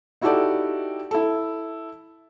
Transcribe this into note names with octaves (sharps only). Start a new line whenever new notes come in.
D#4 E4 F#4 G4 A4 D5
E4 A4